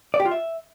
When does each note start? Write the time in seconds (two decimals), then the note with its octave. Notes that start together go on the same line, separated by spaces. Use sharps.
0.14 D5
0.20 G4
0.26 F4
0.31 E5